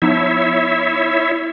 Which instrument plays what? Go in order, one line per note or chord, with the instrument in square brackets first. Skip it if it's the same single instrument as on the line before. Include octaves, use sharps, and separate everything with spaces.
[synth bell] F3 B3 D#4 [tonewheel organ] E4 C#5 E5